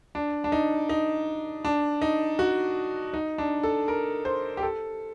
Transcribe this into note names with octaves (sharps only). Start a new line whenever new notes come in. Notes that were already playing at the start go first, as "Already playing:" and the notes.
D4
D4
D#4
D#4
D4
D#4
F#4
D#4
D4
A4
A#4
C5
G4
A4